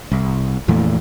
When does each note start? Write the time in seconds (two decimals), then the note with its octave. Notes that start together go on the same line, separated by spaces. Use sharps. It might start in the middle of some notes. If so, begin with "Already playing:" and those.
0.12 C2
0.68 F2 A#2 E3 A3